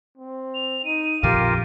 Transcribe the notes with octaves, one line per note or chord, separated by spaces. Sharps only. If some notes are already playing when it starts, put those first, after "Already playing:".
C4
F7
D#4 D#7
A#1 F2 D3 F4 G4 A#4 F5